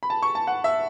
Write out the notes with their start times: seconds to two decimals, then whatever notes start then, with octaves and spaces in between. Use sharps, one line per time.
0.03 B5
0.10 A5
0.23 C#6
0.35 A5
0.47 F#5
0.64 E5